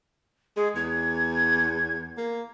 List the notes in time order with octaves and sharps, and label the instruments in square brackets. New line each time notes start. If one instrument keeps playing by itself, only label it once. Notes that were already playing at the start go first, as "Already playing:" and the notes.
[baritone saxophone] G#3 [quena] G#4
[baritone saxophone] E2 [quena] G#6
[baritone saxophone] A#3